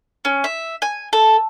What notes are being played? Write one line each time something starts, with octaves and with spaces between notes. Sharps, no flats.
C#4
E5
G#5
A4